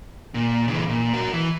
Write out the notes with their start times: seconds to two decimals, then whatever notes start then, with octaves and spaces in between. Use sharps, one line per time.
0.34 A#2
0.68 C#3 E3
0.89 A#2
1.14 F#4 A#4
1.33 E3